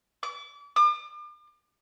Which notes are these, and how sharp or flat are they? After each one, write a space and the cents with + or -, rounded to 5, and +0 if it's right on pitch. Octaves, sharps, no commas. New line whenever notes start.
D6 -35
D6 +40